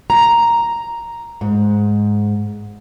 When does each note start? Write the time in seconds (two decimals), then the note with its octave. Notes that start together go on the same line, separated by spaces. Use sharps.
0.10 A#5
1.41 G#2